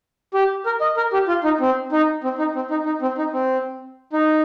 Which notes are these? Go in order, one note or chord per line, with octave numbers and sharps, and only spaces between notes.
G4
A#4
D#5
A#4
G4
F4
D#4
C4
D#4
C4
D#4
C4
D#4
D#4
C4
D#4
C4
D#4